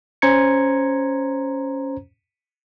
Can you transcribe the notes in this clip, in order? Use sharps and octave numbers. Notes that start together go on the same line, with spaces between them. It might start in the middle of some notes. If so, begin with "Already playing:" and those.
C#4 C5 A#5 G#6 C#7